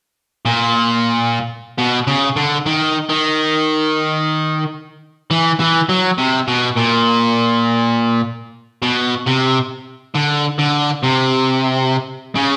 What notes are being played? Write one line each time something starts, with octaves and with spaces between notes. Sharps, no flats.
A#2
B2
C#3
D3
D#3
D#3
E3
E3
F#3
C3
B2
A#2
B2
C3
D3
D3
C3
C#3